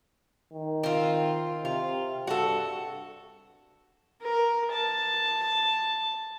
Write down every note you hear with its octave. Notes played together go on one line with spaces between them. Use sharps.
D#3
C4 F4
C3 F4
G2 F#4 A4
A#4
A5